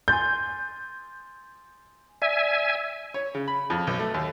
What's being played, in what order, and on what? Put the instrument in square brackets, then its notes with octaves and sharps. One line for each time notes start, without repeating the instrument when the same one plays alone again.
[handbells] G#5 C6 A6 [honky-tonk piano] G6
[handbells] D5 [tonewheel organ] E5 G#5
[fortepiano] C#5
C#3
B5
F2
B1
A3
D#2